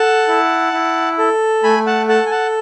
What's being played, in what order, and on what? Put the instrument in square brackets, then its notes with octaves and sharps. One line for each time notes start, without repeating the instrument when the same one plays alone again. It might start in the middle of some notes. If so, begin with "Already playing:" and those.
Already playing: [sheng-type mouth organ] A4 F#5 A5
E4
E4
A4
A3 G#5 B5
F#5 A5
A4 F#5 A5
G#5
F#5 A5